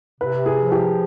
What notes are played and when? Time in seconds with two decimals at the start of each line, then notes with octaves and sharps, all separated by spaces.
0.21 C3 B4
0.46 G#4
0.58 F3
0.72 G4